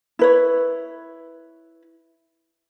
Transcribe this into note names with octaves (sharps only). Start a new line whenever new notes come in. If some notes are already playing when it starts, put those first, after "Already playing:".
E4 B4 C#5